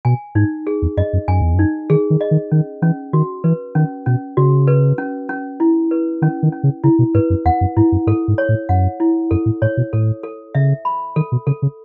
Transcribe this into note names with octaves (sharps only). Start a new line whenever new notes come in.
B2 G#5
G#2 D#4
G#4
E2
F#2 D#5
F#2
F#2 G#5
E2
F#2 D#4
D#3 G#4
D#3
D#5
D#3
D#3 C#4
E3 C#4
D#3 F#4
E3 B4
D#3 C#4
B2 C#4
C#3 F#4
B4
C#4
C#4
E4
B4
D#3 C#4
D#3
C#4
C#3
C#3 E4
B2
G#2 B4
F#2
E2 F#5
F#2
G#2 E4
F#2
G#2 A4
G#2
C#5
A2
F#2 F#5
E4
F#2 A4
A2
A2 C#5
B2
A2 A4
A4
C#3 E5
B5
D#3 A4
B2
C#3 A4
C#3